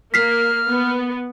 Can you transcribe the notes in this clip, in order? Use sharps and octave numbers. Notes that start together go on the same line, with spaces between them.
A#3 F6 B6 C7
B3